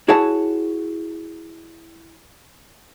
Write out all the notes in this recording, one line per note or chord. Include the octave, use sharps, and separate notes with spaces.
E4 F#4 G#4 C#5 F#5 A5